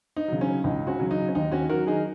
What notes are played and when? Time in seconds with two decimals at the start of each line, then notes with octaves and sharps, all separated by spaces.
0.16 D#4
0.28 C#3 F#3
0.41 C#4
0.64 C#2 D#4
0.87 C#4 F#4
1.00 C#3 F#3
1.11 D#4
1.28 C#4
1.35 D#2 D#4
1.51 C#4 F#4
1.70 D#3 F#3 F#4 A#4
1.87 D#4 G#4